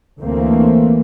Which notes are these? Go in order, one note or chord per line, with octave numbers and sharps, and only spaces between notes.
D2 E3 A3 A#3 C4